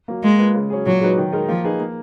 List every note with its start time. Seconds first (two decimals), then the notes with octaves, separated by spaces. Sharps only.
0.08 F#3 A#3
0.23 G#3 A#3
0.38 F4 B4
0.54 C#3
0.70 F#3 C#4 G#4
0.86 A#2 F#3
1.01 G#3 D#4 F#4 B4
1.18 D#3
1.32 G#3 D#4 A#4
1.48 F3 A#3
1.64 D#4 G#4 B4
1.80 A#3